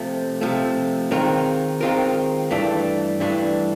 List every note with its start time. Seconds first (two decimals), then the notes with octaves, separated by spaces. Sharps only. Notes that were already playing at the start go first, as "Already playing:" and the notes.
Already playing: C3 F3 A3
0.41 C3 F3 A3
1.11 D#3 G#3 C4 F4 A#4
1.81 D#3 G#3 C4 F4 A#4
2.51 G2 E3 A3 D4
3.20 G2 E3 A3 D4